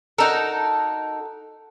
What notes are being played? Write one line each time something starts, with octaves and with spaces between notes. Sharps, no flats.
D#4 F#4 A4 A#4